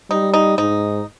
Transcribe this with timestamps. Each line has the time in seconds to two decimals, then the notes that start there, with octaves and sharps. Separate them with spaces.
0.10 G3 D#4
0.33 D#4
0.58 G#2 D#4